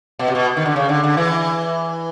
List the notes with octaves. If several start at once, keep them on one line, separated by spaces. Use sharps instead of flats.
B2
C3
B2
D#3
D3
C#3
D3
D3
E3